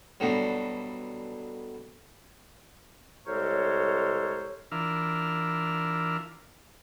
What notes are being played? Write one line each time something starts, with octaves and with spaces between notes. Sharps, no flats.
G2 B2 D3 F#3
C2 G#3 A4 A#4 C5 C#5
E3 D4 F4 A#4 E5 F6